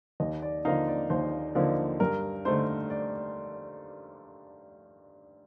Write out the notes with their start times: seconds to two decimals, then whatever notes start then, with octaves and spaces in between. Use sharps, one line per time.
0.20 D#2 D#5
0.42 D5
0.65 D3 F3 A#3 D#4 F5
0.88 D5
1.10 D#2 C5
1.55 D3 F3 A#3 D#4
2.00 G2 A#4
2.45 D3 A3 D#4 C5
2.90 D5